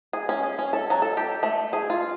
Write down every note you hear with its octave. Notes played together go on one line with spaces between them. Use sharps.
G#4
C#4
G#4
C#4
A4
F#3
A4
G4
A3
G#4
F4